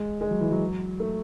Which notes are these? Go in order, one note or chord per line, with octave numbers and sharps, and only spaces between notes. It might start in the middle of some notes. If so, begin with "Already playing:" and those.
Already playing: G#3
G#3
F#3
E3
F#3
A3